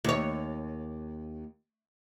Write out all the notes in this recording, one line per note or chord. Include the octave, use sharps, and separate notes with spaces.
D#2 C#5